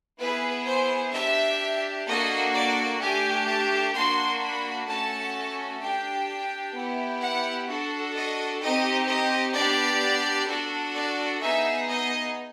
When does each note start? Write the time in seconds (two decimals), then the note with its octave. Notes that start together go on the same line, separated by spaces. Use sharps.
0.19 B3 E4 G#4 B4
0.66 C5
1.13 D4 G4 E5
2.06 A#3 D4 F#4 A4 D#5
2.53 D5
3.00 A3 D4 G4 G#5
3.47 A5
3.93 A#3 D4 F#4 C6
4.40 B5
4.87 A3 C#4 F#4 A4 A5
5.80 D4 G4 G5
6.74 B3 E4 G4
7.21 F#5
7.68 D4 F#4 A4
8.14 D#5
8.61 C4 D#4 G4 D#5
9.08 D#5
9.54 B3 D4 G4 D5
10.48 D4 F#4 A4
10.94 D5
11.41 B3 D#4 G#4 E5
11.89 D#5